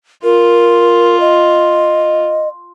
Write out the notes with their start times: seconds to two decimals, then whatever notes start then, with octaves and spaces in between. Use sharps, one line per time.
0.24 F4 A#4
1.20 D#5